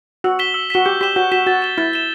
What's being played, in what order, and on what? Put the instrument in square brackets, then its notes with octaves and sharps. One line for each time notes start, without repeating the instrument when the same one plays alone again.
[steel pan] F#4 [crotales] E6
[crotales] B6 E7 G7
E6
[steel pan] F#4 [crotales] B6 E7 G7
[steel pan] G4 [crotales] G6
[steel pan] G4 [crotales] B6 E7 G7
[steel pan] F#4 [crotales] G6
[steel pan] F#4 [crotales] B6 E7 G7
[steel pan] F#4 [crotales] A6
[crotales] E7 G7
[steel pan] E4 [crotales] A6
[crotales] E7 G7